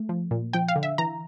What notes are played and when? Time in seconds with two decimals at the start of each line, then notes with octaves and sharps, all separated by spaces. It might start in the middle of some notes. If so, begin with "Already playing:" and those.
Already playing: A3
0.09 F3
0.31 A#2
0.53 F3 G5
0.68 F5
0.76 D3
0.83 E5
0.98 E3 A#5